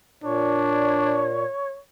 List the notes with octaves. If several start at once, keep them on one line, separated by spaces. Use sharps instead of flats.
A#2 D4 C#5